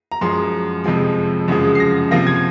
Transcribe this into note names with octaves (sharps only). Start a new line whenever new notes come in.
A#5
F#2 F3 G#3 C6
F2 C3 F3 G#3
F#2 C#3 F3 G#3
C7
A#6
C3 F3 A#3 A#6
G#6